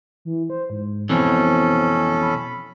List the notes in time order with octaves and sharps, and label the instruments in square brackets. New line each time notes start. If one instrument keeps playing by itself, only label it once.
[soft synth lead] E3
C5
G#2
[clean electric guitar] F2 B2 E3 [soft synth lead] C4 [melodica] C#4 A4
[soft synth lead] B5